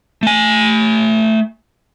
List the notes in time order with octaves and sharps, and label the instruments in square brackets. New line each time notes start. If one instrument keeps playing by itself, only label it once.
[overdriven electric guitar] A3 G#5